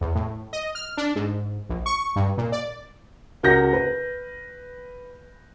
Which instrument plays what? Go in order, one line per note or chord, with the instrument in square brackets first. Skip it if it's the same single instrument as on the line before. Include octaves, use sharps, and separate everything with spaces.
[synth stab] E2
A2
D#5
F6
D4
G#2
A#1
C#6
G2
A#2
D5
[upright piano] C#2 F#4 A#4 F#5 G6 A#6
B4